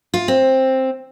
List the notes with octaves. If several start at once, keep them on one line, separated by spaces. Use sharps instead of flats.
F4
C4